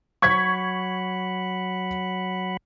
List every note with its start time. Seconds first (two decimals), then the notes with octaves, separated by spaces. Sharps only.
0.22 F#3 F#5 B5 C#6 G#6 B6